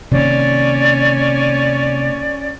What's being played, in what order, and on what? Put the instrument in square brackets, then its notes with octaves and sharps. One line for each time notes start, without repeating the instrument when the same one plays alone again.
[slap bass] C3 D#3 A#3 [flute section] C#4 D5